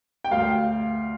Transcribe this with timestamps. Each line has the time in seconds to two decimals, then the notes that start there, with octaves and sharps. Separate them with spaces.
0.24 G5
0.31 D2 F5